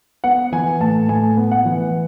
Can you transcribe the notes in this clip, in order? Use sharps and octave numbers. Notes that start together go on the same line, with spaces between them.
B3 F#5
E3 G#5
A2 A5
A2 G#5
B3
F#5
E3